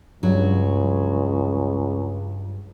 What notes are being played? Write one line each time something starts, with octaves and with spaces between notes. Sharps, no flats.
C#2 G2 F#3